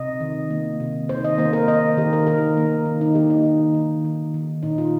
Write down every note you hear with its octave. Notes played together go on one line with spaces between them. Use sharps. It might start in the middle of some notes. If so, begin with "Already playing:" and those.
Already playing: C3 D#5
D#3
A#3
C3
D#3 C5
D#5
A#3 C5
A#4
A#3 D#5
D#3 G4
A#4
D#3 A#4
A#3
D#3
D#4
A#3 G4
D#4
D#3
D#3
D#3
D#3
A#2 D#4
F4